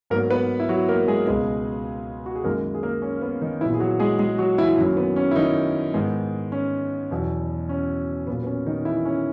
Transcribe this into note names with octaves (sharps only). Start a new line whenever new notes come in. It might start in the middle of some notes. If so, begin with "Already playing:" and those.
G#2 F#3 A#3 B3 A#4
B3 B4
E4
F#3 F#4
A#3 A#4
G#3 G#4
C#2 B2 G#3 B3 G#4
F#4
G#4
F#2 D#3 G#3 A#3 A#4
G#4
A#3 A#4
C#4
B3
D#3 D#4
A#2 E3 F#3 B3 E4
G#4
F#3 F#4
G#3 G#4
G#3 G#4
F#3 F#4
E3 E4
F#2 D#3 F#3 A#3
B3
C#4
E4
D#3 D#4
G#2 D#3 G#3 B3
C#4
E2 B2 F#3
C#4
A#2 F#3 A#3 B3
B3
C#4
D#3 D#4
E3 E4
C#4